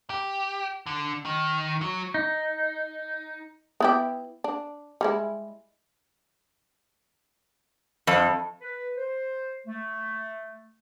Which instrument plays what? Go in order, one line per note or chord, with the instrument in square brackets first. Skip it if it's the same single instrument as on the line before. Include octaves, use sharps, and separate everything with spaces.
[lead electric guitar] G4
D3
D#3
F#3
[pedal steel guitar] D#4
[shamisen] B3 E4 G4
D4
G3 G#3 E4
[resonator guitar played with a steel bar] F2
[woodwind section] B4
C5
A3